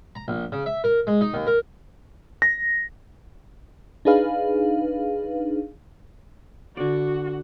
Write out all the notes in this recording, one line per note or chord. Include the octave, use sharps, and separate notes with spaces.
A#5
A#1
C#3
E5
A#4
G#3
D#4
D#2
A#4
A#6
D4 D#4 G#4 B4 F5
D3 F#4 D5